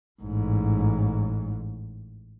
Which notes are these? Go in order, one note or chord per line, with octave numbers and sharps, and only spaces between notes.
A1 G#2